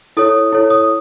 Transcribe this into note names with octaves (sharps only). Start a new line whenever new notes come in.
E4 A4 C#5 D#6
E4 A4 C#5
D#6